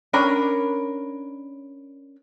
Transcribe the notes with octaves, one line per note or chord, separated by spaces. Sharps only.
C#4 D4 A#4 B5